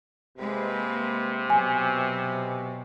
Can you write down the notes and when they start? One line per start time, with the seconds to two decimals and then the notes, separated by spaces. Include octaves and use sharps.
0.38 C3 G#3 A#3 B4
1.50 B2 F#3 G#5